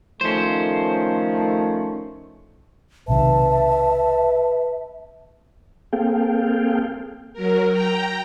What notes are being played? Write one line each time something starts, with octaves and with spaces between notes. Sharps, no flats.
D#3 F3 A3 C#4 C5
B1 C3 D#3 B4 E5 A5
A#3 C4 G#4 A4 F5 G5
F#3 A#4
G5 A#5